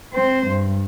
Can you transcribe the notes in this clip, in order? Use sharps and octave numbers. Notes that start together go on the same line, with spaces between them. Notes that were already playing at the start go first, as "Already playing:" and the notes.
C4 C5
G2